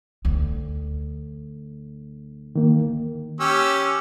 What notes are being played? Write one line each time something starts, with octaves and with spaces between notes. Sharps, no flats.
D2
D#3 A#3
C#4 G4 E6